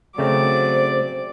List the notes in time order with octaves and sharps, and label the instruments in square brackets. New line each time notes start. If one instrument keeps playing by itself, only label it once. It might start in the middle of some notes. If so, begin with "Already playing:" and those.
[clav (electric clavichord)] C#3 A3 C4 [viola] F#3 D6 [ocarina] C5 [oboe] D5